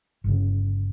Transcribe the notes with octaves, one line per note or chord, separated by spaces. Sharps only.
G1 C#3